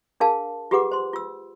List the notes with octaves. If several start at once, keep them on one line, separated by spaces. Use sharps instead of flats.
D4 G#4 A#4 F5 A5
F4 G4 G#4 B4 F#5 D6
C5 C6
F4 E6